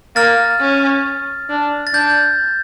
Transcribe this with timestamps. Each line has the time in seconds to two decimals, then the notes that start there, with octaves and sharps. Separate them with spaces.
0.16 A#3 F6 A6
0.61 C#4
1.50 D4
1.87 A6
1.93 D4 G6